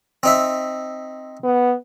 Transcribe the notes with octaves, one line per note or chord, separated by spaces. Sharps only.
C4 D#4 E5
B3